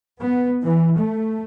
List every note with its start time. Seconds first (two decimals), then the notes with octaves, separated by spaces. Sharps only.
0.21 B3
0.63 E3
0.98 A3